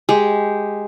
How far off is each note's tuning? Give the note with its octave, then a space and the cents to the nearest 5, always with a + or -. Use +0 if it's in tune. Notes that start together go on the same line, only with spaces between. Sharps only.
G#3 +0 G4 +0